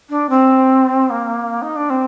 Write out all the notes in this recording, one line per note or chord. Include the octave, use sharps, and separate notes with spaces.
D4
C4
A#3
D#4
D4
C4